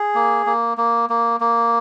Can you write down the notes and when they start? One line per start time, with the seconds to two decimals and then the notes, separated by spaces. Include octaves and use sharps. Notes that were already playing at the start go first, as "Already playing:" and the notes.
Already playing: G#4
0.15 A#3
0.46 A#3
0.78 A#3
1.10 A#3
1.40 A#3